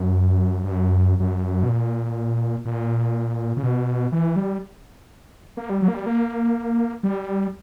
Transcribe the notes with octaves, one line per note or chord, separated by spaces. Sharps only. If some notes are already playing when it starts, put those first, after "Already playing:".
Already playing: F#2
G2
F#2
F#2
B2
A#2
A#2
C#3
B2
E3
G3
A#3
G3
F#3
A#3
G3
A#3
G3